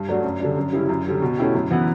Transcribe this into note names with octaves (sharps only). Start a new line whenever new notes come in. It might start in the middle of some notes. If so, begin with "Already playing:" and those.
Already playing: G2
F#3 A3 D4 F#4
F#2
D3 G3 D4
F#2
C#3 G3 C#4 E4
F#2
D3 G3 C#4
B2
A3 C#4 E4 G4
F#2
E3 B3 E4